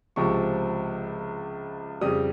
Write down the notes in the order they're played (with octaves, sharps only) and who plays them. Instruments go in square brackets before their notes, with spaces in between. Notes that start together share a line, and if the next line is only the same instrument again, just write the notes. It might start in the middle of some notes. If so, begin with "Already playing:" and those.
[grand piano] C#2 C3 F3 C#6
F2 C#3 G3 D#6